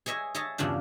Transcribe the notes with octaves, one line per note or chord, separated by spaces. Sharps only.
G#4 C#5 D#5 E5 G#5
G#4 C#5 D#5 E5 A5
E2 G2 C#3 F3 D4